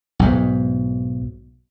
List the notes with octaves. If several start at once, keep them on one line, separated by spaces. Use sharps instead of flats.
B1 G#2